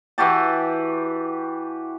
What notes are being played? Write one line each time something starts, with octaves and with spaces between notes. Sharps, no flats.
E3 F#4 G4 A5